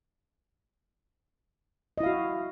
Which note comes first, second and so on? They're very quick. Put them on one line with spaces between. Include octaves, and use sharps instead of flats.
D#5 E4 F5 F#4